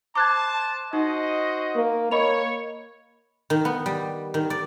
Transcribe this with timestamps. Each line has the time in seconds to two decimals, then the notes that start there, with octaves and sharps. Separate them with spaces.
0.15 C5 A5 D6 F#6 G#6
0.93 D#4 F#4 C5 D#5
1.76 A#3
2.11 A#3 C#5 D#5 B5 F7
3.50 D#3
3.65 B3
3.86 G3
4.34 D#3
4.50 D5